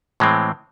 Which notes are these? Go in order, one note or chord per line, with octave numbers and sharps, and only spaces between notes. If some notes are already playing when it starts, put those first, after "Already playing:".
A2 E3 G#3 C4